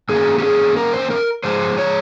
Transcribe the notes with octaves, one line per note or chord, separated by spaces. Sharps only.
D#3 A#3 C#4 G#4
G4
G#4
A#4
C5
A#4
C#3 F3 G#3 C5
C#5